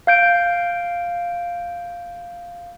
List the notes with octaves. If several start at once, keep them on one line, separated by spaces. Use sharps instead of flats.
F5 G6 D7